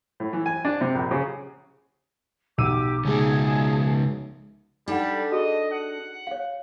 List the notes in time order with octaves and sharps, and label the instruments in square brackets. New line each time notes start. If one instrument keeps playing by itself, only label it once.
[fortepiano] A2
E3
G#5
D4
C3
A#1
C#3
[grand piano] B1 E6 D#7 [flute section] G4 D6
[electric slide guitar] C#3 G#3 D#4 [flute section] G#4 A5
[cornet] G3 [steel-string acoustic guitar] D4 A4 [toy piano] D#4 F#5
[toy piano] F#4 G#4 [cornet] D#5
[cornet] F#5
[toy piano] C#5 F5